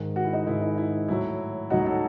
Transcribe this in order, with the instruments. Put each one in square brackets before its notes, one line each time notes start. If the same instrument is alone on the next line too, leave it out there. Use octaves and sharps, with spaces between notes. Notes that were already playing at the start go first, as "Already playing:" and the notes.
Already playing: [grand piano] G#2 D#3 G#3
F#4
E4
D#4 F#4
G#2 D#3 G#3 E4
D#4
E4
A2 F#3 E4
A2 D#4 F#4
F#3
F#4 A4